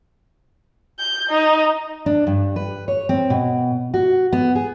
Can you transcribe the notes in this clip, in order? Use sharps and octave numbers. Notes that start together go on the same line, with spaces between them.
G6
D#4
D4
G2
B4
C#5
C4
B2
F#4
B3
G#4